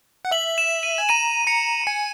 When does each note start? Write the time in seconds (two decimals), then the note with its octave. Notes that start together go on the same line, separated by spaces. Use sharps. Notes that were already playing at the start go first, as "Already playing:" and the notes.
0.25 F#5
0.31 E5 F#7
0.58 E7
0.83 D#7
0.98 G#5
1.09 A#5 D#7
1.47 A#5 C#7
1.87 G#5 C#7